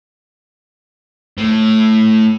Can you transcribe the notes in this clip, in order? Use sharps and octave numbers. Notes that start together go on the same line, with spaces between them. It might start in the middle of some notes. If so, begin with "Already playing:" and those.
A2